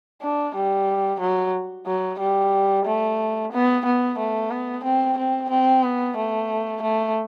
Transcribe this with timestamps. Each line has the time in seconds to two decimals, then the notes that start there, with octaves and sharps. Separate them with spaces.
0.22 D4
0.55 G3
1.20 F#3
1.86 F#3
2.19 G3
2.85 A3
3.52 B3
3.85 B3
4.19 A3
4.50 B3
4.84 C4
5.18 C4
5.50 C4
5.83 B3
6.17 A3
6.82 A3